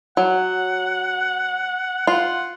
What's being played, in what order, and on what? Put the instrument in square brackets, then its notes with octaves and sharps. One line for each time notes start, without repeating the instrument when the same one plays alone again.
[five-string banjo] F#3 [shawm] F#5
[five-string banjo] F4 [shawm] F#5